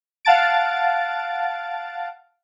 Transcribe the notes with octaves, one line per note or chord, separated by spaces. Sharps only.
F5 F#5 A5 A6 D7